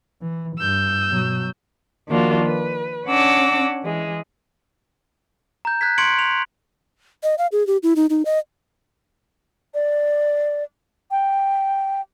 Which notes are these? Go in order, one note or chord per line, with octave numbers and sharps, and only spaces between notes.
E3
G2 E6 G6
B2 F#3
D#3 F3 A#3 D4 F4 F#4
B4
C#4 D4 F#5 D6 E6 A#6
E3 G#3
A#5 G6
F#6 G#6 B6
C6 C#6 G#6 C#7 D7 F#7
F7
D#5
F5
G#4
G4
E4
D#4
D#4
D#5
D5
G5